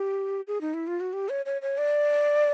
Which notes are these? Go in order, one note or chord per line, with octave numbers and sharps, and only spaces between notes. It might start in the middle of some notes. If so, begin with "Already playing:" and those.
Already playing: G4
G#4
D#4
E4
F4
F#4
G4
C#5
C#5
C#5
D5